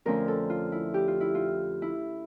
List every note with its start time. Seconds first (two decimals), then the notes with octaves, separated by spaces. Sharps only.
0.05 F2 D3 F3 A3 C#4 A#4
0.28 A4
0.50 F4
0.72 E4
0.94 G4
1.08 F4
1.21 E4
1.35 F4
1.82 E4